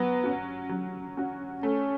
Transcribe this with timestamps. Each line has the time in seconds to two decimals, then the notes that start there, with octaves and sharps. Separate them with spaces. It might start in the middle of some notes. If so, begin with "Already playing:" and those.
Already playing: F#3 B3
0.23 C#4 F#4
0.69 F#3
1.17 C#4 F#4
1.63 A3 C#4